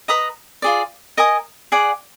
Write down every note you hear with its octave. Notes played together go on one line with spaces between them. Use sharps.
B4 D#5 A#5 D#6
F4 G#4 D5
A#4 D#5 G#5 D#6
G#4 D5 F#5